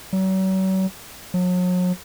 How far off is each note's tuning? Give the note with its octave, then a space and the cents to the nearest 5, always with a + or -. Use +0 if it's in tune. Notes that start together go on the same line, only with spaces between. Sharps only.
F#3 +40
F#3 -40